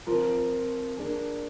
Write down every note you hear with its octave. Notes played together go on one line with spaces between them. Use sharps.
F3 C4 F4 A#4
A#3 D4 G#4